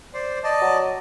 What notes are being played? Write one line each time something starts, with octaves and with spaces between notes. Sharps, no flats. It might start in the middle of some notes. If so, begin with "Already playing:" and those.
C5 D5 C6
D5 D#5 A5
F#3